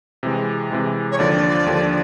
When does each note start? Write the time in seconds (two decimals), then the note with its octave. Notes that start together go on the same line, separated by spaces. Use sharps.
0.23 C3 E3 G#3
0.71 C3 E3 G#3
1.12 C#5
1.18 D#2 D3 F3 D5
1.66 D#2 D3 F3